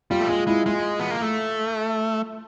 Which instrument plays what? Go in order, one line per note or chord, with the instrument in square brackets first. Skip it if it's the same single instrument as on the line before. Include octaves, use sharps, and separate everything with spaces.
[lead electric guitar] G3 [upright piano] F4
[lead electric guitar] A3
[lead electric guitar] G#3 [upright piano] F4
[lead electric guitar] G#3 [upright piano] E4
[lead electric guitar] G#3 [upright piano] F4
[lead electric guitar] B3
A#3
A3